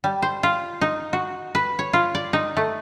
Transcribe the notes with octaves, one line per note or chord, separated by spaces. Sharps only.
G3
C5
F4
D#4
F#4
B4
C#5
F4
D5
D#4
A3